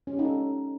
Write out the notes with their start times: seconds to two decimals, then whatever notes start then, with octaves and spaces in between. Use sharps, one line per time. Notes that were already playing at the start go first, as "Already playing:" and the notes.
0.07 C#4
0.13 G4
0.19 D#4
0.25 A4